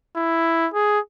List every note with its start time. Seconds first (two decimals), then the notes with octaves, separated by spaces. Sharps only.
0.16 E4
0.74 G#4